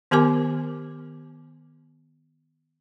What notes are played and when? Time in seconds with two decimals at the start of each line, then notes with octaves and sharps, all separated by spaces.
0.11 D#3 B3 G4 A#4 G#5 D6